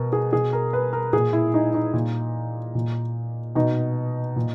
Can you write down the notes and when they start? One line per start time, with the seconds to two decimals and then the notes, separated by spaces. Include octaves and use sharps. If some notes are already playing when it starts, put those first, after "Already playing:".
Already playing: B2 A#4
0.13 G#4
0.32 B2 G#4
0.53 A#4
0.73 B4
0.93 A#4
1.13 A#2 G#4
1.33 E4
1.54 D#4
1.74 D#4
1.93 A#2
2.75 A#2
3.55 B2 D#4
4.36 A#2